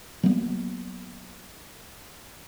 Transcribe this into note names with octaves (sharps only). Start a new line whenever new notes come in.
F#3 G3 A#3 B3